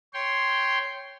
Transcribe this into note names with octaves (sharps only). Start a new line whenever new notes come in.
C#5 G5 C6